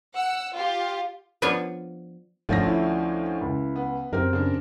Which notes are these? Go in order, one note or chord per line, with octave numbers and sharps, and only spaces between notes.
F#5 E6
F4 G4
F3 B3 D4 B4 C#5 F5
G#1 D2 F3 A3 C#4 A#6
E4
C#2
B3
F#2 C4 G4 A#4
C#3 D4